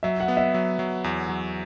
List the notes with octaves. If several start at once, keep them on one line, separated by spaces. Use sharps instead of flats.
F#3 E5
F#5
B3
E5
F#3
F#3
E2
F#3